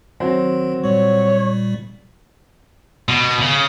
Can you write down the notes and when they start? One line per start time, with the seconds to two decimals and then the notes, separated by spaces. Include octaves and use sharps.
0.20 D#3 F#3 C4
0.84 A#2 G3 C#5
3.08 B2
3.40 C#3